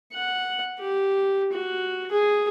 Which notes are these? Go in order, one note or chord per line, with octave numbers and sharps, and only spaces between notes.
F#5
G4
F#4
G#4